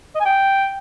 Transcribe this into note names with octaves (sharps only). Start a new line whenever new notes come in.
D#5
G#5
G5